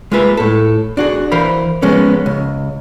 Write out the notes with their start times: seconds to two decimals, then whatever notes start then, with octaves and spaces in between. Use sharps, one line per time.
0.12 G#3 A#3 F4 B4 E5
0.37 A2 A4
0.97 D4 F#4 G#4
1.32 E3 A#4 C5 F5 B5
1.82 F3 G#3 A#3 B3 C#4
2.26 C#2